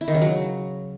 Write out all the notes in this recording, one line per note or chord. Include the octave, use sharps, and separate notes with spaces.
E4
D#3
C#3
F#3